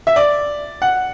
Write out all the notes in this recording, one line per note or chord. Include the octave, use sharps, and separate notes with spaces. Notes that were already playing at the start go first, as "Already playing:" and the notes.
E5
D5
F#5